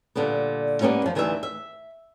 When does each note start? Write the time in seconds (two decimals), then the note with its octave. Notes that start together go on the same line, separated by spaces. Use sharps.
0.15 A#2 D3 G3 B3
0.81 G3 A#3 B3 C#4 F4
1.02 F#2 F3
1.15 D2 D#3 E3 G3 F#4 E5
1.43 E5